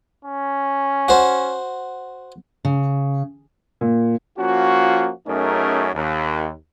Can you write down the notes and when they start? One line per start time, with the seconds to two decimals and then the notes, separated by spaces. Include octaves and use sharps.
0.25 C#4
1.08 F#4 C5
2.65 C#3
3.81 A#2
4.39 F3 A#3 C#4 F4 F#4
5.27 F#2 A3 C#4 D#4 G#4 A#4
5.95 D#2